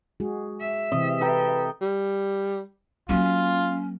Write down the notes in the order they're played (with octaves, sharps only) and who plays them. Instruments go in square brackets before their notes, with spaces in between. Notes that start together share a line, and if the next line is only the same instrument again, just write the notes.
[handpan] G#3 F#4 G#4
[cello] E5
[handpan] C3 E3 C4 [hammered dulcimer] D#5
[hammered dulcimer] A4 G5 A#5 [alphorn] B4
[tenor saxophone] G3
[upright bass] F#3 A#3 [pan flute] C#4 [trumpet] F4